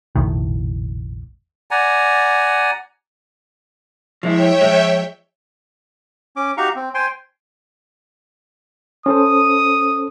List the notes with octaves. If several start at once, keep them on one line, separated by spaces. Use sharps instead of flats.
F1 A#1 A2 D#3
D5 F#5 G#5 A#5
F3 G#3 E4 C#5 E5 G5
F3 G#3
C#4 D6
D#4 F#4 G4 F5 A#5 C#6
C4
C5 G5 G#5 C6
C#4 A4 C5 D#6